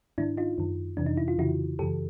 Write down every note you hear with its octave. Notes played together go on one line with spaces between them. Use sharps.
G#2 D#3 D4 E4
D#4 F4
F#2 D#3
F2 C3 E3 D4
D#4
E4
F4
F2 C#3 E3 E4 F#4
F#2 C#3 E3 G4 A4